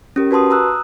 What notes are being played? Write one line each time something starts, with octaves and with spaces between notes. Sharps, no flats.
C#4 G4 A#4
F#4 B4 A5 C6 D#6
A#5 D#6 E6 F#6